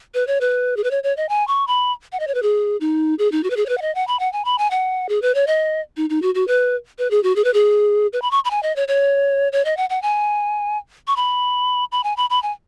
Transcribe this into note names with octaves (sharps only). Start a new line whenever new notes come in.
B4
C#5
B4
G#4
B4
C#5
C#5
D#5
G#5
C#6
B5
F#5
D#5
C#5
B4
G#4
D#4
G#4
D#4
F#4
B4
G#4
C#5
B4
F#5
D#5
F#5
B5
F#5
G#5
B5
G#5
F#5
G#4
B4
C#5
D#5
D#4
D#4
F#4
F#4
B4
B4
G#4
F#4
G#4
B4
G#4
B4
B5
C#6
B5
G#5
D#5
C#5
C#5
C#5
D#5
F#5
F#5
G#5
C#6
B5
B5
G#5
B5
B5
G#5